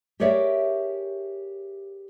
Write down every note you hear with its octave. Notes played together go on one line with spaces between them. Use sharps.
G4 G#4 A#4 C#5 D5 E5